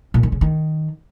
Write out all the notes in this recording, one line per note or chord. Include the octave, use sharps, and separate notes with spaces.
A#2
D#3
C#3
D#3